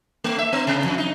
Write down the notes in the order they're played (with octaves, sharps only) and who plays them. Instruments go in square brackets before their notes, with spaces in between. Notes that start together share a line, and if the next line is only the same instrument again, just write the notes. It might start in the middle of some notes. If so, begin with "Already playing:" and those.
[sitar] A3
E5
B3
C3
F2
D#4